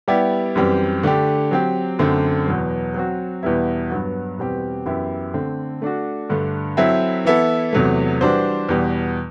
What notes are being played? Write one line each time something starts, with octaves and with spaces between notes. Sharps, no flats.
G3 B3 E4 G4 D5
F#2 E3 G3 C4 G4
D3 A3 D4 G4
F#3 C4 G4
F#2 D3 A3 C4
E2 B2 F#3
F#3 C4 F#4
E2 B2 G3 B3 E4
G2 F#3 B3 F#4
E2 B2 G3 C4 G4
F#2 E3 B3 E4 G4
D3 A3 C4
A3 D4 F#4
G2 D3 A3
F#3 C4 E4 A4 E5
E3 B3 E4 A4
E2 C3 F#3 A3
E3 G3 D4 F#4 C5
E2 B2 G3